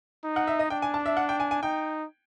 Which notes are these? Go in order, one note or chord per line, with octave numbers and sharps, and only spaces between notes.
D#4
F#5
E5
D#5
D4 G5
G#5
A5
E5
F#5
G5
G#5
G#5
D#4 G5